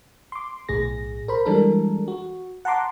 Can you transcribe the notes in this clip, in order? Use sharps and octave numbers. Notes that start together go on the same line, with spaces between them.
C6 D6
B1 A2 G#4 A#6
A#4 C5 B5
E3 G3 G#3 D4 A4 A#4
F#4
F#5 A5 A#5 C6 D6